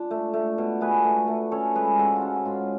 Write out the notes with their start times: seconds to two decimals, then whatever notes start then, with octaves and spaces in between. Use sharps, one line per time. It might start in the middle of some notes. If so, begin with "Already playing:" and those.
Already playing: D4 F4
0.11 A3
0.33 A3
0.58 B2
0.81 A3 G#4 B4
1.04 A3
1.28 A3
1.51 C#4 A4 C#5
1.75 G#3 G#4 B4
1.99 G#2 F#4 A4
2.16 F4
2.22 C#4 F#4
2.35 F#4
2.45 G#2 F4